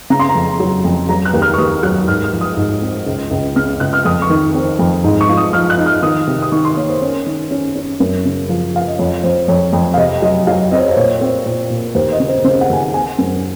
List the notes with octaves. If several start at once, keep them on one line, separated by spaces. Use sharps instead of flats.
C#3 A#5
C6
A#5
F2
F#3
F2
F#3 A#5
F#6
D#2
F6
C#6
D#2 D#6
F#3 F#6
G#2 F6
F6
F3
D#6
G#2
C4
C#2
C#2
C#3 F6
C#2 F#6
F6
F2 D#6
C#6
D#3
C4
F2
G#2
C#6
F3
D#6
F3 F6
F#6
D#4
F6
D#3 D#6
C3
D#6
D#3 C#6
C6
A#3 C#5
C5
C#4 C#5
D#3
C#4
C#4
F#2
C#3
F3
F3 F5
D#5
F2 C#5
F2 C5
F2 C#5
F2
F5
C3 D#5
F#3 D#5
F#3 F5
C4 D#5
C#5
C5
A#2 C#5
C4
A#2
A#2
D#2 C5
D#5
C#3
C5
C#3 C5
F#5
D#2 G#5
F#5
C4 G#5
F#2